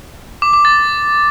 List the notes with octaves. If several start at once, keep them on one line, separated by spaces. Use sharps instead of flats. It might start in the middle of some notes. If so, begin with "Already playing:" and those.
D6
D6
A6